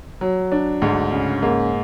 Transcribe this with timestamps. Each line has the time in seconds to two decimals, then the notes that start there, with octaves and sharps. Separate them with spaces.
0.21 F#3
0.52 D4
0.82 D2 G#2
1.12 C#3
1.42 G#2 A#3